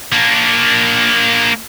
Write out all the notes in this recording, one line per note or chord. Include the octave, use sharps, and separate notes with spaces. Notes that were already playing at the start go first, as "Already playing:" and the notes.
A#3 D4